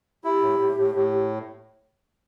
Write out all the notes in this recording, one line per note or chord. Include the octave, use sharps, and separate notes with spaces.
E4 G4
A2
A2
A2
A2